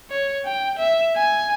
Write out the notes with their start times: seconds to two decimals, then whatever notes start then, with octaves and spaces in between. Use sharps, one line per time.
0.11 C#5
0.45 G5
0.79 E5
1.16 G#5